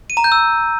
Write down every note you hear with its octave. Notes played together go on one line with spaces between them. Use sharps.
D#7
A#5
G6
E6